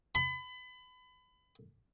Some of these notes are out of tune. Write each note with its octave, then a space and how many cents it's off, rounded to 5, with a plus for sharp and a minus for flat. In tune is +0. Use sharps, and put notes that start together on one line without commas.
B5 +30